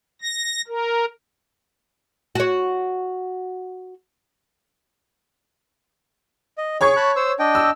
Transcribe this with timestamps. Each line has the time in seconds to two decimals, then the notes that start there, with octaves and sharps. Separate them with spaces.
0.22 A#6
0.68 A#4
2.35 F#4 C#5
6.58 D#5
6.81 G#4 C#5 C#6 G#6
6.97 A5 B5 F#6
7.16 C5 E6
7.39 D4 D#5 G5
7.55 E6